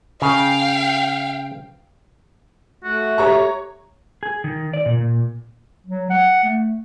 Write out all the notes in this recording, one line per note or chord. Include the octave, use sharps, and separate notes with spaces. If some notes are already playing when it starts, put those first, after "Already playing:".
C#3 F5 G5
A3 F#4
G4 C#5 A#5 C#6
G#4
D#3
D5
A#2
A#2
F#3
F#5
A3